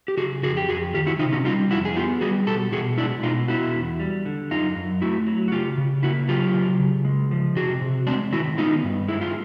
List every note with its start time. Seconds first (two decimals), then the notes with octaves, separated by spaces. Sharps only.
0.08 G4
0.17 C#3 F#4 G#4
0.43 F2 F#4 G#4
0.57 G4
0.69 F2 F#4 G#4
0.94 D#3 F4 G4
1.07 E4 F#4
1.19 C3 D#4 F4
1.33 C#4 D#4
1.44 G3 D#4 F4
1.71 F2 E4 F#4
1.85 G#4
1.96 B3 F4 G4
2.21 G3 F#4 G#4
2.47 B2 G4 A4
2.72 B2 F#4 G#4
2.97 G#3 D4 E4
3.23 B2 D#4 F4
3.48 B3 E4 F#4
3.75 E2
4.00 G3
4.25 D3
4.51 F#2 D#4 F4
4.76 F#2
5.02 A3 E4 F#4
5.27 F#3
5.48 F#4
5.52 C#3 F4 G4
5.77 C#3
6.03 A#3 E4 F#4
6.28 F#3 F4 G4
6.54 C#3
6.80 C#3
7.05 G#3
7.31 F3
7.56 C3 F#4 G#4
7.81 C3
8.07 G#3 C4 D4
8.32 D#3 E4 F#4
8.58 B3 D#4 F4
8.84 G2
9.08 G#3 E4
9.21 F4